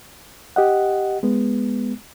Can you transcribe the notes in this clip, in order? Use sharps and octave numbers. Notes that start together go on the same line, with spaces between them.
G4 D#5 F#5
G#3 B3